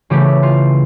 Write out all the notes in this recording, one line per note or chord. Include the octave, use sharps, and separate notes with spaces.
C#3 E3 A3 G4
F4